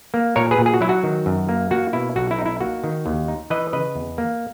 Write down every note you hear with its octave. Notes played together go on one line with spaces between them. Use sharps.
A#3
A#2 A#4 C#5
G#4 B4
A#2
G#4
F#4
F#3 E4
F#4
D#3
F#2
A#3
A#3 F#4
B2 E4
B1 F#4
E4
D#4
E4
A#3 F#4
D#3
D#2
D#4
E3 B4 D#5
C#3 B4 D#5
E2
A#3